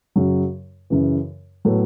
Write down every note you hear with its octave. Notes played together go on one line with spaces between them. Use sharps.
F#2 C#3 F#3
F#2 C#3 E3
A2 F#3 B3 A4